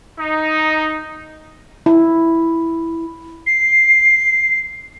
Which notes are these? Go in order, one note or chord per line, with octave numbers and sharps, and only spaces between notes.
D#4
E4
C7